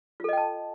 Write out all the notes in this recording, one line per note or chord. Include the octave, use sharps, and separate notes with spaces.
F4 A4 D#5 G5 A5